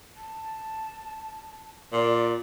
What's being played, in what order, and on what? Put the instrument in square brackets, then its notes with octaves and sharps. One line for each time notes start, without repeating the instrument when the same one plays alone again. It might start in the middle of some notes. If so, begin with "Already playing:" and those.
[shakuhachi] A5
[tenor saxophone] A#2 [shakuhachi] D5